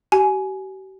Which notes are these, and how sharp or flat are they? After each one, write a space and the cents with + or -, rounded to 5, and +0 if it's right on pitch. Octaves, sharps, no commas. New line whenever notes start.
G4 -45 G#5 +15